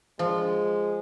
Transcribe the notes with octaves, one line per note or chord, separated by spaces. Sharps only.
F3 G#3